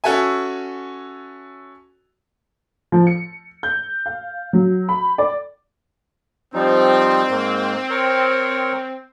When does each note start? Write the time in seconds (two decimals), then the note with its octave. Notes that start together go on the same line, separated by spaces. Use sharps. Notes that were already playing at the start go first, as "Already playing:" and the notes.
0.04 C#4 F#4 A4 E5 G#5
2.92 F3
3.07 C#7
3.63 G6
4.06 F5
4.53 F#3
4.89 B5
5.18 D5
6.54 F3 G3 C4 D#4
7.30 G#2 A#3
7.90 A#4 C#5